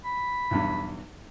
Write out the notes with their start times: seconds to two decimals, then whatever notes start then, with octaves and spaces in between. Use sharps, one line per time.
0.04 B5
0.51 B1 E2 G2